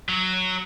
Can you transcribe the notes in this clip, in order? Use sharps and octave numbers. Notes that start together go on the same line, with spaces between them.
F#3